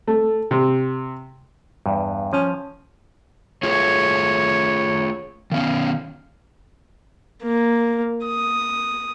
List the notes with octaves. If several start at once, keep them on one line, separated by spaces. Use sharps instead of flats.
A3
C3
E2 G2
F3 C#4
A3 F4 G#4 C#5
D#3 B3 C#4 F5
A#3
D#6